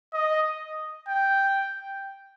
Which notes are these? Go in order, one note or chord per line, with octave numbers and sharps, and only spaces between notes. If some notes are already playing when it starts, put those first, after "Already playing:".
D#5
G5